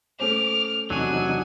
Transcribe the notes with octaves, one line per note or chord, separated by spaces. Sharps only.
A3 C#4 C5 D6 F6
E2 C3 F#3 D4 D#4 F#4 G#5